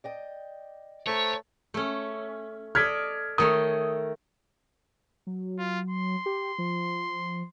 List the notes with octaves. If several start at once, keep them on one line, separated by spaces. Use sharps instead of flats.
D5 D#5 G5
A3 C5 C#5 A#5
A3 C#4
A4 D5 D#5 F6 G#6 B6
D#3 A3 C#5 D#6
F#3
F4
C6
G4
F3